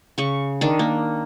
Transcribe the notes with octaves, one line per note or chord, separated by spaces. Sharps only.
C#3 C#6
D#3 D4
A#3